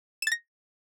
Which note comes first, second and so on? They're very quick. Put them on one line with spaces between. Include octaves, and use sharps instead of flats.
E7 A6 A#6